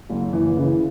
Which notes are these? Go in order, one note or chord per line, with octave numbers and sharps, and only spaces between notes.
F#1
E3
C#3